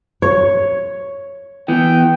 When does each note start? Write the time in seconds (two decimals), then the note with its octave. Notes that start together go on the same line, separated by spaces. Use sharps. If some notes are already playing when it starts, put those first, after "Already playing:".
0.22 C#5
1.68 E3 B3 G5